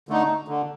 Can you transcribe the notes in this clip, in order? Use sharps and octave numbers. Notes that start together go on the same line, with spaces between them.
D3 A3 D#4
D3